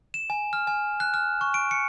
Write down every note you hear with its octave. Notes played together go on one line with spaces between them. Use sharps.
E7
G#5
F6
G#5
F#6
F6
C#6
D7
C#7